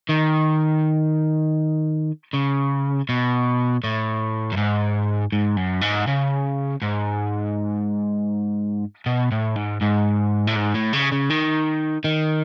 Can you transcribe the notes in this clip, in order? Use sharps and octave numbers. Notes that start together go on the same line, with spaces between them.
D#3
C#3
B2
A2
F#2
G#2
G#2
F#2
G#2
C#3
G#2
B2
A2
G#2
G#2
A2
G#2
A2
C#3
C#3
D#3
D#3